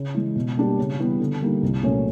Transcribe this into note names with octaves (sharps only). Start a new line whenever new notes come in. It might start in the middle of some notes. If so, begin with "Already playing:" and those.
Already playing: C#3
E3 G#3
B2
G3 A#3 D4 G4
C#3
E3 G3 B3
D3
G3 A#3 D#4
C2
A#2 F#3 A3 C#4